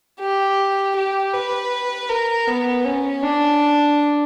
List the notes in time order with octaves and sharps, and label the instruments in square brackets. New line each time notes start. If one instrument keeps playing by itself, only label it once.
[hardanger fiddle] G4
G4
B4
A#4
B3
C#4
D4